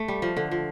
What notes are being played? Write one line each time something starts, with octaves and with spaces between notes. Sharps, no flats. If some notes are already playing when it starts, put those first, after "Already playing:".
Already playing: A3
G3
F3
D3
F3